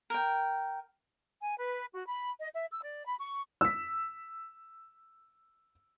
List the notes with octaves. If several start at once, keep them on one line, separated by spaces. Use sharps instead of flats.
A#4 G5
G#5
B4
F#4
B5
D#5
E5
E6
D5
B5
C#6
E6 B6